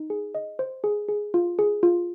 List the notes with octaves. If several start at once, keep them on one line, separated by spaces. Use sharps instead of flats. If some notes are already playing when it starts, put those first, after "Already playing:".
Already playing: D#4
G#4
D#5
C5
G#4
G#4
F4
G#4
F4